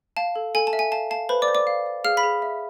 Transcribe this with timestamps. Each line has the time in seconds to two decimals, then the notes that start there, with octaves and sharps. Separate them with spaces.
0.17 F5 A5
0.36 A4
0.55 A4 G#5
0.67 A5
0.73 E5
0.79 G#5
0.92 F5 A5
1.10 F5 A5
1.29 B4 C5 B5
1.42 D5 D6
1.48 C5
1.55 D5 D6
1.67 F5
1.86 D5
2.04 G#4 F5 F6
2.17 B5 B6
2.23 G#4
2.42 E5